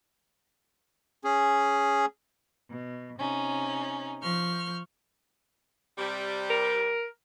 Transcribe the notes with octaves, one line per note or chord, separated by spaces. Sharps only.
C#4 G#4
B2
C3 C#4 D#4
F3 C#6 F6 G6
C3 G3
A#4